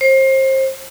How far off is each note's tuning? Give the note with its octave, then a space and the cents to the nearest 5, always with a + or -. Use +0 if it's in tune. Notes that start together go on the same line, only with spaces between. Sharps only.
C5 +30